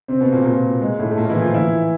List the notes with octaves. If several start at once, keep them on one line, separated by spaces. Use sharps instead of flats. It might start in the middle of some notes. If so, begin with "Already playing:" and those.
C3 C4
B2 B3
A#2 A#3
A#2 A#3
G#3
A2 A3
A3
A#2 A#3
F4
E3 E4
F3 F4
E3 E4